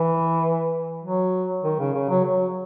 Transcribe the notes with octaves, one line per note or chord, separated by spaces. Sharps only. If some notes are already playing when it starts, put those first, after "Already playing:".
Already playing: E3
F#3
D#3
C#3
C#3
F#3
F#3